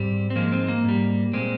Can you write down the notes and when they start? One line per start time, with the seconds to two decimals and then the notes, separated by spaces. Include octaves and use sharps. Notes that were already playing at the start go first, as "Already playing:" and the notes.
Already playing: G#2 G3 C4
0.30 C4
0.36 G#2 F3 G#3 A#3
0.52 C4
0.68 A#3
0.84 G#2 G3
1.33 A#2 G#3 C4